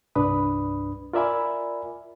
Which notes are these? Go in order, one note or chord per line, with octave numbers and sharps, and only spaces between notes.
C2 G2 D4 B4 B5 D#6
F4 A#4 D5 E5 G#5 B5